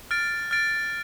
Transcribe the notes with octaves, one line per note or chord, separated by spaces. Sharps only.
F6 A6 D7
F6 A6 D7